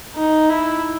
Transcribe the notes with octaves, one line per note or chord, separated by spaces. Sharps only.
D#4
E4